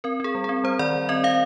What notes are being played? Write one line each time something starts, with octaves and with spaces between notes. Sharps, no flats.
C4 A#4
C4 G#4
G3
C4 G#4
G3 C5
D#3 D5
D#3
C4 D#5
C4 F5